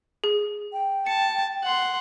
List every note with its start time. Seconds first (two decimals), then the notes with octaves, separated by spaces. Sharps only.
0.24 G#4
0.73 G5
1.07 A5 C#7
1.63 F#5 C6